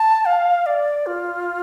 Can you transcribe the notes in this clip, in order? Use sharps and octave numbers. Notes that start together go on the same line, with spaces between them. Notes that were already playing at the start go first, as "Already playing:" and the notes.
Already playing: A5
F5
D5
F4